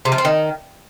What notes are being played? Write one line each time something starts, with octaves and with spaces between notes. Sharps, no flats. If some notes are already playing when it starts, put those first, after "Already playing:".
C3
F3
C4
D#3